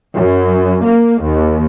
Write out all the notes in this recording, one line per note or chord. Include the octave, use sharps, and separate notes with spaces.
F#2
A#3
D#2